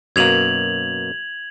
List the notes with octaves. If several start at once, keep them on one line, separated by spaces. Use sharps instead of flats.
F#2 B2 A#3 G#6 F7 F#7